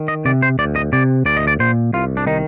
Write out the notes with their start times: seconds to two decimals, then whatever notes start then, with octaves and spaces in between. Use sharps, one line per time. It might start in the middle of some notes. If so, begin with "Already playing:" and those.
Already playing: D#3
0.08 D#5
0.25 C3 D5
0.42 C5
0.59 D2 D5
0.76 D#5
0.93 C3 D5
1.26 D2 D5
1.37 D#5
1.47 D5
1.59 A#2 C5
1.93 C2 F4
2.17 D4
2.27 D#3 D#4